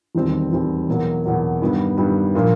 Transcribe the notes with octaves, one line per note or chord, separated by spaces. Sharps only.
E1 D#2 D#3 G3 C4
E1 D#2 D#3 G3 C4
E2 B2 F#3 A#3
E2 B2 F#3 A#3
G2 D#3 G3 B3
G2 D#3 G3 B3
A#2 F3 A#3 D4 F4